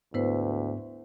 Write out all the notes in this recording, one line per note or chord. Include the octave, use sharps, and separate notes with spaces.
D2 G#2 B3 E4 B4 C5